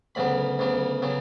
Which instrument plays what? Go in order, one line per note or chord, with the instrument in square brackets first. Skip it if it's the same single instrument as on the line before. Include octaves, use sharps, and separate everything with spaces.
[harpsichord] D2 C#3 F#3 B3 B5
D2 C#3 F#3 B3
C#3 F#3 B3